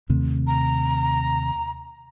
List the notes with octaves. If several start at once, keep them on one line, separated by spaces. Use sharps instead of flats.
D#2 C3 A3
A#5